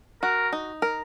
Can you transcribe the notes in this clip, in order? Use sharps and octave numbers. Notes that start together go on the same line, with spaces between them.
F#4 A#4
D#4
A#4